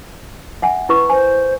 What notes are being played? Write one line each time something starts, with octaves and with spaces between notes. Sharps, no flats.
E5 F#5 G#5
E4 B4 C#6
C5 G#5